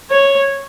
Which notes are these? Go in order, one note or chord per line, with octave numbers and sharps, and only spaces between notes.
C#5